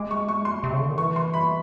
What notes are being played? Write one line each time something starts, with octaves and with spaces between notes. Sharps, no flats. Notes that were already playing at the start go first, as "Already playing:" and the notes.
Already playing: G#3 D6
C#6
C#6
C6
C3
C#3
D3
D#3
E3 C#6
C6
B5